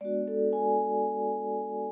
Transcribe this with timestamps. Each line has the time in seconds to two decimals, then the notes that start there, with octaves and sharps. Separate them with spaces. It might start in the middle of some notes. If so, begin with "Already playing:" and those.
0.01 G#3 B3 D4 F#4 D5
0.28 A4
0.53 G#5